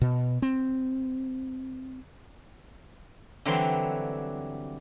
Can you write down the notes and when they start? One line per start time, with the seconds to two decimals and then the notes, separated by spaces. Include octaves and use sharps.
0.01 B2
0.42 C4
3.45 D3 E3 F#3 G3 C4 C6